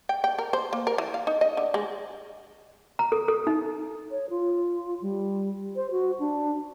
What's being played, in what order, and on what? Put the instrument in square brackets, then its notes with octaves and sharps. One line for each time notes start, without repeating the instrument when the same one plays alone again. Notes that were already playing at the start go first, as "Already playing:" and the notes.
[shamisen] G5
G5
A#4
C5
A#3
A#4
E3
F5
D#4
D#5
D3
G#3
[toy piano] A#5
A4
A4
D#4
[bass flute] C#5
F4
G3
C5
F#4
D4